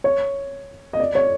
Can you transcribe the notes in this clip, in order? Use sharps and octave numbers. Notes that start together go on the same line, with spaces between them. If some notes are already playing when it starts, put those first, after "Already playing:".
C#5
D#5
D5
C#5